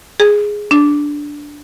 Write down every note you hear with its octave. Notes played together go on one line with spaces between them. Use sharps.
G#4
D4